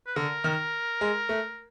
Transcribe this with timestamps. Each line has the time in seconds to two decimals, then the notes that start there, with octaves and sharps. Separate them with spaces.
0.07 B4
0.16 D3 A#4
0.44 D#3
1.01 G#3
1.29 A3